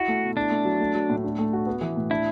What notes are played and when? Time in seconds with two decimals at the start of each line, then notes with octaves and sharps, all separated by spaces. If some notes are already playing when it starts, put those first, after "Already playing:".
Already playing: E4 F#4
0.08 A3
0.22 B2
0.37 D4 E4
0.51 A3
0.65 F#3
0.80 A3
0.95 F#3
1.10 A2
1.24 D4
1.39 A3
1.53 F#4
1.66 B3
1.81 E3
1.96 A2
2.10 D4 E4